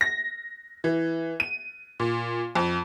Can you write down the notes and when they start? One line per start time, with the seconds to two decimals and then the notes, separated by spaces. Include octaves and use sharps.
0.01 A#6
0.84 E3
1.40 D#7
2.00 A#2
2.55 F2